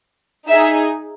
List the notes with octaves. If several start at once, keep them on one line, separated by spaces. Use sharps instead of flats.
D#4 G#4 E5